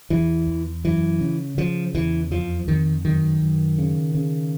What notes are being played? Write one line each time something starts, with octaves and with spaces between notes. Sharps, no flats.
E2 E3
E2
F#2 E3
C#3
C#3 F3
E2 E3
F2 F3
F2 D#3
F#2 D#3
F#2
C#3
C#3